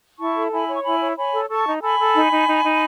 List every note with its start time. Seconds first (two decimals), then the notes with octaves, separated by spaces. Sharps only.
0.19 E4 A5 C#6
0.36 A4
0.52 E4 G#5 B5
0.68 C#5
0.75 C#6
0.84 E4 G#5 B5
1.02 C#5
1.17 C#5 G#5 B5
1.33 A4
1.49 A4 A5 C#6
1.66 D#4
1.82 A4 G#5 B5
2.00 A4
2.15 D#4
2.32 D#4
2.48 D#4
2.64 D#4